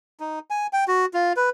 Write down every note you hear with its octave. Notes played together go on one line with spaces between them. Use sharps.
D#4
G#5
G5
F#4
F4
B4